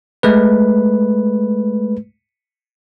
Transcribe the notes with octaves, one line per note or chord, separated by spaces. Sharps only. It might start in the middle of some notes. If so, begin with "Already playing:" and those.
G#3 A3 B4